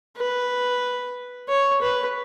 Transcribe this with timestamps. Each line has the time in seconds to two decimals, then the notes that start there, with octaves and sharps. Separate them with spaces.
0.17 B4
1.49 C#5
1.82 B4